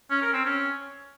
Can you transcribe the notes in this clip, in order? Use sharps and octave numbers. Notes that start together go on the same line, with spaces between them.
C#4
A#4
C4
C#4